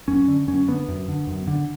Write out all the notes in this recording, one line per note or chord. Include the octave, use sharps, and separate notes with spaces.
F#2 C#4
D3
F#2 C#4
D3 B3
F#2
D3
F#2
D3